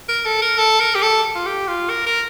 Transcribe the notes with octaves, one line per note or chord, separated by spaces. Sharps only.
A#4
A4
A#4
A4
A#4
G4
A4
F4
G4
F4
A#4
A#4